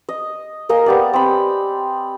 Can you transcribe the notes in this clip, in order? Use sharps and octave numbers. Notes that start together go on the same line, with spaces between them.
D#5
A#3 A#4 D#5 G#5
B3 G4 D5
C4 B5